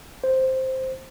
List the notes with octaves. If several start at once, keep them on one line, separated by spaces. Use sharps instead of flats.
C5